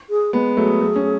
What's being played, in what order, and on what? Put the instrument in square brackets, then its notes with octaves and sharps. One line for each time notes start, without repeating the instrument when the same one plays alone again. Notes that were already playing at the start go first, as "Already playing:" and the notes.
[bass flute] G#4
[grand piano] G#3 B3
[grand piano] F#3 A3 [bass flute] G#4
[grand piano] F#3 A3
C#4